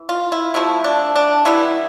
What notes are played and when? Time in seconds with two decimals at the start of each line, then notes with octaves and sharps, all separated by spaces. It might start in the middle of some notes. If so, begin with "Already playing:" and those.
Already playing: E3
0.09 F4
0.32 E4
0.54 C3 F3 A3 E4
0.84 D4
1.16 D4
1.45 E3 G3 B3 E4